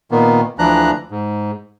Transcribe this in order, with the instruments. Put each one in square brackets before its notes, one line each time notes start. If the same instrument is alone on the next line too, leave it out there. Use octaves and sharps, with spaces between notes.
[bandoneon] A#2 D#3 A#3 B3
D2 E3 F3 D4 A#5 F#6
G#2